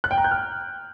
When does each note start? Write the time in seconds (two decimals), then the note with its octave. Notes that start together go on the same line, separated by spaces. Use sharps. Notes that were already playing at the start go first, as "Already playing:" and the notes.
0.04 F#6
0.11 G5
0.18 A#5
0.24 G6
0.31 F6